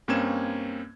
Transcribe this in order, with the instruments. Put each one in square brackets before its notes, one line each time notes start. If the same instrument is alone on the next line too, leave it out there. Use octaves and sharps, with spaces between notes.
[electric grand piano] G2 A#3 C4 C#4 G#6 E7